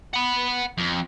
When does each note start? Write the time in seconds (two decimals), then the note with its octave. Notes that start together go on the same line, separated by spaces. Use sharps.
0.14 F#5 B5
0.78 F2